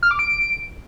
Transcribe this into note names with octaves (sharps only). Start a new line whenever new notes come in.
F6
D6
D7